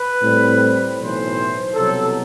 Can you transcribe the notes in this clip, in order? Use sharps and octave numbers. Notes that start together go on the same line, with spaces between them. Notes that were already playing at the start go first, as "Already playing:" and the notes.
Already playing: B4
A2 G3 C4
B1 A2 E3 C5
C2 B2 F#3 A4